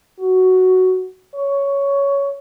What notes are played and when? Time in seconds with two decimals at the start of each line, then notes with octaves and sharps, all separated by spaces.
0.20 F#4
1.35 C#5